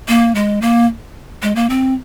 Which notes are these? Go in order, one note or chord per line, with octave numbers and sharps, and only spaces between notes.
A#3
G#3
A#3
G#3
A#3
C4